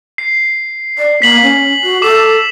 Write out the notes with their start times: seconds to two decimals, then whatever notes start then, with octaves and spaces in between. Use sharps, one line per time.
0.18 C7
0.98 D5
1.22 A#3 B6 F#7
1.43 C#4
1.83 F#4
2.02 A4 D6 E7